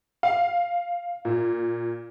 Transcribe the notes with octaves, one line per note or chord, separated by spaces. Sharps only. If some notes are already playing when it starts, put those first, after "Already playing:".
F5
A#2